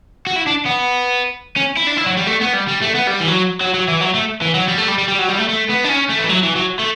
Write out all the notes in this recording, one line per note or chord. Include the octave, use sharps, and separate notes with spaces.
F#4
E4
D4
B3
C#4
E4
D4
E4
F#3
G3
A3
B3
G3
G3
A3
B3
G3
E3
F#3
F#3
F#3
E3
F#3
A3
E3
F#3
G3
A3
G3
G3
G3
F#3
G3
A3
A3
B3
D4
C#4
A3
E3
F#3
E3
F#3
A3